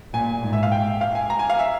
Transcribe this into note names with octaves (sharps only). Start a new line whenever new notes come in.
A#2 G#5
G#2
E5
F5
G5
F5
G#5
A#5
G#5
F5
E5